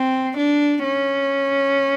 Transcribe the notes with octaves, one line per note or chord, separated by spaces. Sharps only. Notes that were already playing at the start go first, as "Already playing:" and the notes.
Already playing: C4
D4
C#4